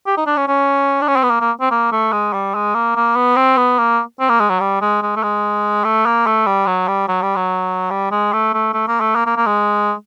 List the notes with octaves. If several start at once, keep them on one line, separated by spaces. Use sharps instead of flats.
G4
D#4
D4
C#4
C#4
D4
C#4
C4
B3
A#3
A#3
C4
A#3
A3
G#3
G3
G#3
A#3
A#3
B3
C4
B3
A#3
C4
A#3
G#3
F#3
G3
G#3
G#3
A3
G#3
A3
A#3
A3
G3
F#3
G3
F#3
G3
F#3
G3
G#3
A3
A3
A3
A#3
A3
A#3
A#3
A#3
G#3